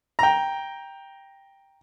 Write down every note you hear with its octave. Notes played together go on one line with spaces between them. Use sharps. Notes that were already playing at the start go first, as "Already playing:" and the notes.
G5 A#5